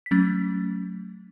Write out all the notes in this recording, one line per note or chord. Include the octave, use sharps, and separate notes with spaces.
B6
F#3 A3 C#4 A6